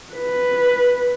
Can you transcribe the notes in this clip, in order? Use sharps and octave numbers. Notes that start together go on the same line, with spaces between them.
B4